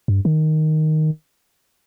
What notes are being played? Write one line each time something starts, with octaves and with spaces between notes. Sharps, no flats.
G2
D#3